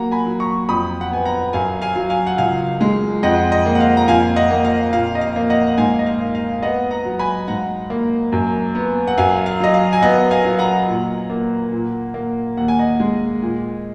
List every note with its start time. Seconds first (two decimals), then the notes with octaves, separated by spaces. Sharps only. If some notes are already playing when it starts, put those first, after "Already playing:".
Already playing: F#3 A#3 F#5 A#5
0.11 G#5 B5
0.26 F#3
0.40 A#5 C#6
0.69 F2 B5 D#6
1.01 F#5
1.11 B3 G#5
1.25 F#5 A#5
1.53 F#2 F5 G#5
1.82 F5 G#5
1.96 F#3
2.10 F5 G#5
2.27 F#5
2.38 C#2 F5 G#5
2.81 G#3
3.23 F2 D#5 F#5
3.52 D#5
3.66 A#3
3.75 F#5
3.80 F5
3.97 A#5
4.08 F2 F5 G#5
4.36 D#5 F#5
4.51 A#3
4.65 F5
4.93 A#2 F5
5.15 D#5
5.21 F5
5.36 A#3
5.50 D#5 F#5
5.67 F#5
5.78 G#2 F5 G#5
5.99 D#5
6.06 F5
6.20 A#3
6.35 F5
6.63 B3 D#5 F#5
6.91 F#5 A#5
7.05 F#3
7.19 G#5 B5
7.48 G#2 F#5 A#5
7.90 A#3
8.32 F#2
8.75 B3
9.07 F#5
9.18 F#2 F5 G#5
9.46 F5
9.60 F#3 D#5
9.74 F5
9.93 G#5
10.02 B3 D#5 F#5
10.31 F5 G#5
10.45 F#3
10.59 F#5 A#5
10.88 A#2
11.30 A#3
11.72 A#2
12.14 A#3
12.57 D#2 F#5
12.68 G#5
12.79 D#5 F#5
13.00 G#3
13.42 A#2